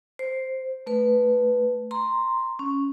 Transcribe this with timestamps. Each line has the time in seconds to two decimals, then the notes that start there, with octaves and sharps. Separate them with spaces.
0.19 C5
0.86 A3 B4
1.91 A#5 C6
2.59 C#4